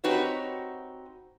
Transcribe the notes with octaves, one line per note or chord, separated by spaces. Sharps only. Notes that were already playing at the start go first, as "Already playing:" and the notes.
C4 D#4 F#4 G4 B4 C#5